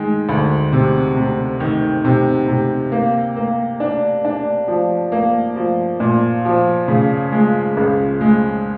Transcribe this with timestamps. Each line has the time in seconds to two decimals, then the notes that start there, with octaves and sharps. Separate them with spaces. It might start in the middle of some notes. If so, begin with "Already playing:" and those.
Already playing: D#3 G#3
0.29 D2
0.72 C3
1.17 C3
1.60 D#3
2.05 C3
2.48 C3
2.92 A#3
3.37 A#3
3.80 D4
4.25 D4
4.68 F3
5.12 A#3
5.56 F3
6.00 A#2
6.45 F3
6.88 C#3
7.32 G#3
7.77 C#2
8.21 G#3